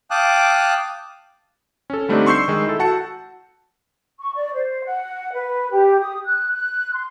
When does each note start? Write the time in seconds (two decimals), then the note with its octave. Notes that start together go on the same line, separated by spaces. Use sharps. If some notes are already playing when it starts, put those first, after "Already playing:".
0.11 F5 G5 A5 D6 D#6 F#6
1.90 C#4 A4
2.09 D3 G3 A3 C4 D4 D#4
2.26 C6 C#6 E6 G6 C7
2.48 D#3 G#3
2.67 E4 A4
2.79 F#4 F#5 A5 C#7
4.18 C#6
4.35 D5
4.53 C5
4.84 F#5
5.33 B4
5.71 G4
5.99 D#6
6.25 F#6
6.52 F#6
6.94 C6